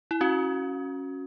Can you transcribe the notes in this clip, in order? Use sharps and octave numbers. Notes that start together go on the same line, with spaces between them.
E4
C#4 F#4